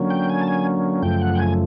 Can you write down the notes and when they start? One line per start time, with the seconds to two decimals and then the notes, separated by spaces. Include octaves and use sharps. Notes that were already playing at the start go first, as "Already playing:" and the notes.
Already playing: D3 F#3 A#3 C#4
0.10 G5
0.29 G#5
0.41 A5
0.48 G#5
1.02 F#2 C#3 F3 A3 G5
1.21 F#5
1.35 G5
1.39 G#5